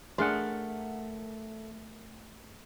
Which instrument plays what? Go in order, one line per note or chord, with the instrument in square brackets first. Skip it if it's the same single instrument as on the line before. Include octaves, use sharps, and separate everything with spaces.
[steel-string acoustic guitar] A3 [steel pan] D4 G#4 C6 [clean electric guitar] A#4 F#5